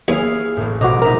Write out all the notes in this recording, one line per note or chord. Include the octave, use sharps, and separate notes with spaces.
D#2 E4 G#4 C#5 F5
A1 A2
A#1 B2 F#4 D#5 A#5 D6
B2 D#4 A#4 E5 A#5